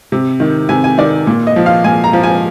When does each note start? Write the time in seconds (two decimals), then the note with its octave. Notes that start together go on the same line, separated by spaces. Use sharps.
0.12 C3
0.40 D#3
0.69 C3 G#5
0.84 G#5
0.98 D#3 D5
1.27 A#2
1.47 D#5
1.56 F3
1.66 F5
1.84 A#2 G#5
2.04 A#5
2.13 F3
2.23 G#5